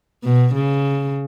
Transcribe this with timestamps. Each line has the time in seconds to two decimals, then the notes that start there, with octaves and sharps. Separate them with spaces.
0.24 B2
0.54 C#3